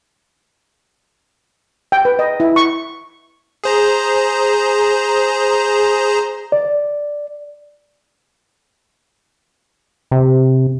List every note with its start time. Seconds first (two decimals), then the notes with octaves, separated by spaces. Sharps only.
1.92 G5
2.05 B4
2.19 D#5
2.40 E4
2.56 C#6
3.64 G#4 C5 A#5
6.52 D5
10.11 C3